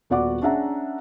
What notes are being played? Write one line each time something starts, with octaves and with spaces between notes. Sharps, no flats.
D#1 B3 F#4 D5 F#5 D6
C#4 D4 G#4 E5 F#5 A#5